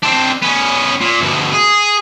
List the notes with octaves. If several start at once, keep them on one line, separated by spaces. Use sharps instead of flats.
C4 D4
B3 C#4
A#2
D2 B2
G#4